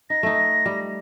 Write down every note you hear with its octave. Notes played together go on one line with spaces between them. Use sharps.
D#4 A#6
A3 D#4
G3